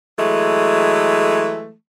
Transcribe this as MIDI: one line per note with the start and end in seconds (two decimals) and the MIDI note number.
0.19 1.74 52
0.19 1.74 54
0.19 1.74 56
0.19 1.74 57